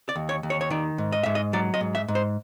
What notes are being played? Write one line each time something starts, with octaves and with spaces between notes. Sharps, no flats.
D5
D#2
C#5
D#2
C#5
C#5
D#3 D5
G#2
D#5
G#2 E5
D#5
F#3 D5
D#5
G#2
E5
G#2
C5